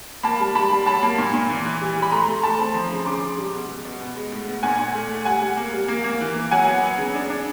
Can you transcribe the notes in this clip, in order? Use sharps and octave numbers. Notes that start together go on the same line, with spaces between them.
A#3 A5 B5
G3
G3 A5 B5
G3
F#3 A5 B5
A#3
A#2
A#2
E3
E3
G3
G3
B5
A3 A#5 C6
A3
A3 A5 B5
C4
F3 A#5 C6
C#3
C#3 C6 D6
C#3
G3
B2
G3
B2
B3
G#3
A2
B3
A#2 F#5 G#5
A#2
A3
A3
G3 F#5 G#5
G3
A#3
G3
A#3
A#3
E3
A#3
F#3 F#5 G#5
B3
B3
C#3
D4
D4